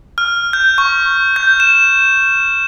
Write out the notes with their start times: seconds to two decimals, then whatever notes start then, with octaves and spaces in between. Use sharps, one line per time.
0.18 F6
0.53 G6
0.78 C#6
1.36 G6
1.60 E7